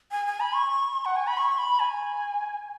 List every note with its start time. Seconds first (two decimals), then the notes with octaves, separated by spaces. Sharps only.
0.12 G#5
0.26 G#5
0.40 B5
0.54 C#6
1.05 F#5
1.16 G#5
1.27 B5
1.38 C#6
1.58 B5
1.80 G#5